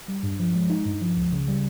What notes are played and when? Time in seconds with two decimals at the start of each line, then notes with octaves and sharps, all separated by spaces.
0.08 G3
0.23 G2
0.40 F3
0.55 G#3
0.70 D#4
0.86 G2
1.01 F3
1.17 C#2
1.32 C#3
1.48 G3